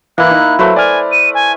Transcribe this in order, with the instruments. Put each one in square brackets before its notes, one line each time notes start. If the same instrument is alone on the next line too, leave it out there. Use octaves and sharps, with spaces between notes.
[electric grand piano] E3 [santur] A#3 E4 [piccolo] F#6
[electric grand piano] D#4
[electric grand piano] F#3 [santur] A3 B4 C5
[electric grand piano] D5 F6 [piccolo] G#5
[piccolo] D#7
G#5